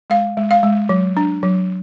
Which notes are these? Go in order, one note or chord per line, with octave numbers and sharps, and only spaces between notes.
G#3 F5
G#3
F5
G#3
F#3
D4
F#3